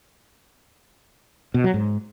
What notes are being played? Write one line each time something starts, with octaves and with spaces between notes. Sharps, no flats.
B2
F#3
G#2